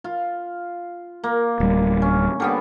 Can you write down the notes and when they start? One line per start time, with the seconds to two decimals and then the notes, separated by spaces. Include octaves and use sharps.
0.04 F4
1.23 A#3
1.60 D1 G3
2.02 C#4
2.40 D3 G3 B3